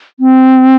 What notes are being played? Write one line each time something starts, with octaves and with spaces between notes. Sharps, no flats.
C4